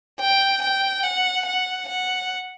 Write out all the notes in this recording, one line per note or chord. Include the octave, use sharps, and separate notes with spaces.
G5
G5
F#5
F#5
F#5